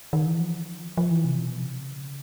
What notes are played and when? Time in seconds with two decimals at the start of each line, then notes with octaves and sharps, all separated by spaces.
0.13 D#3
0.27 E3
0.40 F3
0.97 F3
1.11 E3
1.25 C3
1.39 B2
1.60 C3
1.81 C#3